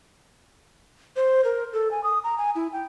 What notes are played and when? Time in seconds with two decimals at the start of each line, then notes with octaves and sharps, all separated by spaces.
1.16 C5
1.44 A#4
1.73 A4
1.91 G#5
2.04 D#6
2.24 A#5
2.38 G#5
2.56 E4
2.73 G5